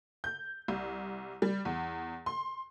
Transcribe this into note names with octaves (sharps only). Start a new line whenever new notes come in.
G6
C2
G3
E2
C6